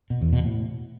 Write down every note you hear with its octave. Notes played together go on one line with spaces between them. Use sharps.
B2
E2
B2
A2